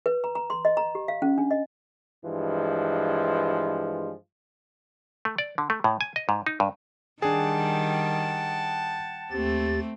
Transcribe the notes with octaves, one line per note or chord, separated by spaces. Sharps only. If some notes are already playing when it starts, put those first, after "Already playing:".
B4
A#5
A#5
C6
D#5
A#5
G4
F5
C#4
D4
D#5
G2 E3 F3 G#3
A3
D5
D3
A3
A2
G#5
D#5
G#2
D#4
G2
D#3 G3 D4 G#4 F#5 G5 A5
D#2 A3 C4 G4 A6